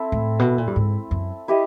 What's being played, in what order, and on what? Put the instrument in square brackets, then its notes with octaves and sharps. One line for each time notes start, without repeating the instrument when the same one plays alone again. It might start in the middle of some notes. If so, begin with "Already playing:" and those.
Already playing: [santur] C4 E4 A4
[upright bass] A2
B2
A#2
G2
G#2
F#2
[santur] E4 G4 C5 D#5